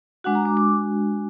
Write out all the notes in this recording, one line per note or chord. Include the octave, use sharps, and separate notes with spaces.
G#3 D4 F#4 F#5
A#5
D6
D6